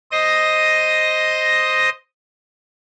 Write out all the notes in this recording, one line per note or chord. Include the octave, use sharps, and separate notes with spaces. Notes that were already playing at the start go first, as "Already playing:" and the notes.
C5 D#5 D#6 A#6